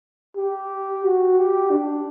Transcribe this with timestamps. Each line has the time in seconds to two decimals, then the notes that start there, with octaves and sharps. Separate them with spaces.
0.37 G4
1.04 F#4
1.38 G4
1.70 D4